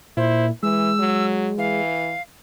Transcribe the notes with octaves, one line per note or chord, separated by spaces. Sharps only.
A#2 E4 C5
E3 G#3 E6
F#3
E3 F5